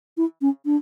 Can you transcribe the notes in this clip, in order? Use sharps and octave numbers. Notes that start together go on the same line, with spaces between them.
E4
C#4
D4